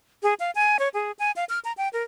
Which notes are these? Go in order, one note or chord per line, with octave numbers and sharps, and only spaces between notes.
G#4
F5
G#5
C#5
G#4
G#5
F5
F6
A#5
G5
A#4